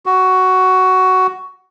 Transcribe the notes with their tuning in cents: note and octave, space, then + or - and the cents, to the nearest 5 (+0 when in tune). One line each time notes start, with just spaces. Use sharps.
F#4 +10